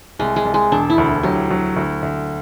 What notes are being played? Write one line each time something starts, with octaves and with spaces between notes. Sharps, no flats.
C2 G#3
G#3
C2
G#3
E1 D4
E4
D2
F#3 G4
F#3
D2
D2